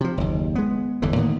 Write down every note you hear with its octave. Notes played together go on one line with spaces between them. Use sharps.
C3 F3
F#1 D#2
G#3 B3
G1 E2 D3 E3
A2 D#3 A#3 B3